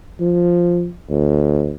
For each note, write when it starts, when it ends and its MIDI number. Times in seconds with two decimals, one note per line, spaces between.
0.20 0.90 53
1.10 1.76 38